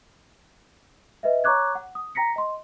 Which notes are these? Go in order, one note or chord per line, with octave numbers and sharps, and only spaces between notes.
B4 D#5 E5
C#5 A#5 C#6 D6 F#6 G#6
F#5
D#6
G5 A#5 A#6 B6 C#7
D#5 C6